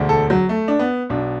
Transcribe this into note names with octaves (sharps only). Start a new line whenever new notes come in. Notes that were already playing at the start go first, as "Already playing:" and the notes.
Already playing: E1 D2 D3
A4
F#3
A3
D4
B3
B1 B2 D4